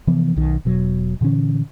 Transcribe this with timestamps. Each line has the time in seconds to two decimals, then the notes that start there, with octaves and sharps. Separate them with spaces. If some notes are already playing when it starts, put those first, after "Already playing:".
0.07 C3 E3 F3 B3
0.36 B1 D#3
0.65 E1 B2 F#3
1.21 A#2 D3 E3 C#4